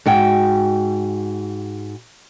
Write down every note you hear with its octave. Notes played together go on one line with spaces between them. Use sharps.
G#2 F#4 G5